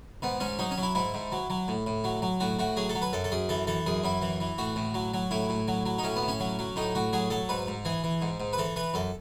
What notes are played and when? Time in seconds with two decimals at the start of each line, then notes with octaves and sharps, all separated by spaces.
0.22 G#2 B3
0.40 G#2 C#4
0.59 F#3 D#4
0.71 C#4
0.78 F#3 E4
0.95 G#2 E4
1.14 G#2
1.32 F#3
1.50 F#3
1.68 A2
1.86 A2
2.04 F#3
2.22 F#3
2.40 A2 F#4
2.59 A2 F#4
2.77 F#3 G#4
2.89 A4
2.95 F#3
3.02 B4
3.13 F#2 A4
3.24 A4
3.32 F#2 G#4
3.49 E3 A4
3.67 E3 A4
3.86 F#2 G#4
4.04 F#2 E4
4.22 E3
4.40 E3
4.58 A2 F#4
4.76 A2
4.94 F#3
5.14 F#3
5.31 A2 E4
5.49 A2
5.68 F#3
5.86 F#3
5.98 D#4
6.04 A2 C#4
6.16 B3
6.23 A2
6.28 C#4
6.40 F#3
6.59 F#3
6.76 A2 D#4
6.95 A2 F#4
7.13 F#3 G#4
7.30 F#3 A4
7.49 G#2 B4
7.67 G#2
7.85 E3 G#4
8.04 E3
8.22 G#2
8.40 G#2
8.53 B4
8.58 E3 A4
8.76 E3 B4
8.94 F#2 A4